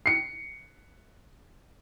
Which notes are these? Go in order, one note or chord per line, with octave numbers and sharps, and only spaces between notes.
C7 C#7